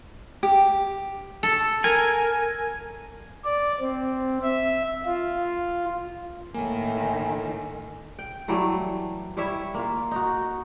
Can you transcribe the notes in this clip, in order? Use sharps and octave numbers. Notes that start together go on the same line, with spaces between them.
G4
A4
A#4 G#5
D5
C4
E5
F4
A2 D#3 A3 A#3 G#5
G5
E3 F#3 G3 A3
G3 E4 C#5 E5
A#3 F4
D#4 F#4